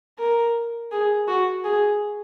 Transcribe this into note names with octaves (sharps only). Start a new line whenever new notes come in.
A#4
G#4
F#4
G#4